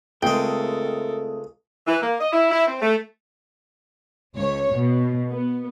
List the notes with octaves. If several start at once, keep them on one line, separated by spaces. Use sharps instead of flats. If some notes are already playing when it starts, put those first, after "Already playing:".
C#2 G#3 A3 C4 A4 A#4 G5
E3
A#3
D#5
E4
E4
C4
A3
C#2 C#5
B2
B3